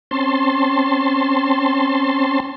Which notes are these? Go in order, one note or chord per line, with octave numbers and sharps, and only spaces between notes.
C4 C#4 A5 C6